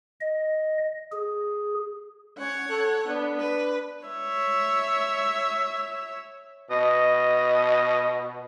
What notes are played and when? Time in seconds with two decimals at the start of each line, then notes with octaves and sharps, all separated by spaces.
0.21 D#5
1.12 G#4
2.38 C#4 C#5 F#5
2.69 A4
3.07 B3 D4
3.39 B4
4.06 C#5 E5
6.71 B2 D#5